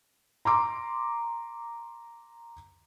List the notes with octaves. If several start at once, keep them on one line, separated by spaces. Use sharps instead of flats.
A#5 C6 D6